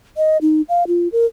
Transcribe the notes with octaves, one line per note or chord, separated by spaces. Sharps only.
D#5
D#4
F5
F4
A#4